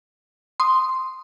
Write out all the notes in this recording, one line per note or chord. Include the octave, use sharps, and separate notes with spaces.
C6 D#6